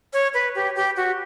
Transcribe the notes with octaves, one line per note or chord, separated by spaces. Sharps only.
C#5
B4
G4
G4
F#4